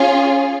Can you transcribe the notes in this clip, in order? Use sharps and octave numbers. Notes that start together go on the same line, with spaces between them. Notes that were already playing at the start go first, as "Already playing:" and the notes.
Already playing: C#4 F4 G#4